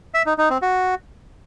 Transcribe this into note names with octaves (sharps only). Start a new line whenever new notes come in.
E5
D#4
D#4
C4
F#4